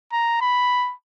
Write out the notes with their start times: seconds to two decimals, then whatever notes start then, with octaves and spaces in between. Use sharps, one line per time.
0.13 A#5
0.41 B5